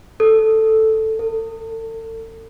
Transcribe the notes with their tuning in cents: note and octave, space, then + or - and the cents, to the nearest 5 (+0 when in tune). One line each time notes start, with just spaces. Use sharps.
A4 +0
A4 +40